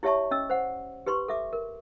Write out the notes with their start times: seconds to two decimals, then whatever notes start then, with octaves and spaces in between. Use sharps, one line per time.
0.03 E4 G4 C#5 E5 A5 C#6
0.31 C#4 D#5 E6
0.50 C5 F#5
1.06 G4 B4 C6 C#6
1.28 A4 E5 D6
1.53 A#4